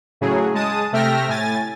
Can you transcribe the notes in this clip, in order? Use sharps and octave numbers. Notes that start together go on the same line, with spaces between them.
A2 C#3 F#3 G#4
G#3 A5 D#6
C3 A3 E5 G5 F6 A#6
A2 G#5 A6